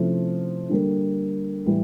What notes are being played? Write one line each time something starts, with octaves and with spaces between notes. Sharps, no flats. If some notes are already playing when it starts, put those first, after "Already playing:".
Already playing: C3 F3 A3 C#4 E4
D3 G3 A#3
A2 E3 G3